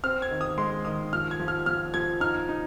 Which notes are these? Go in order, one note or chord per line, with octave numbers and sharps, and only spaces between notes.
C4 F6
G#6
D#3
D#6
G#3 C6
D#3 D#6
F3 F6
G#6
F3
F6
F3 F6
F3 G#6
D#4 F6
D#4